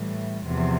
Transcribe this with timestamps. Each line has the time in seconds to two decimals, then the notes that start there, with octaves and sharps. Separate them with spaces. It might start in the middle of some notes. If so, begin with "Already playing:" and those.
Already playing: A2 E3 G3
0.45 E2 C3 F3